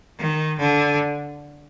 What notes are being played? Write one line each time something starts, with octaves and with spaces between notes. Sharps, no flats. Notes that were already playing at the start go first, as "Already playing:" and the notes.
D#3
D3